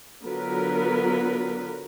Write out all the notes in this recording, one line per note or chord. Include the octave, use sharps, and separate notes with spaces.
D3 F#3 B3 F4 A#4 B4